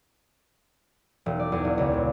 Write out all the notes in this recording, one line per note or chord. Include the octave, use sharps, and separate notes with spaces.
E1
D5
E2
E1
C#2
A#2